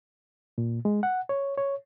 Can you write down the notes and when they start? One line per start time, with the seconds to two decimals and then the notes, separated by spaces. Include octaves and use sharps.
0.58 A#2
0.85 G#3
1.03 F#5
1.29 C#5
1.58 C#5